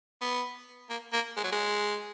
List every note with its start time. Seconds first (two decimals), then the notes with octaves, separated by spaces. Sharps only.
0.21 B3
0.90 A#3
1.13 A#3
1.37 G#3
1.44 F#3
1.52 G#3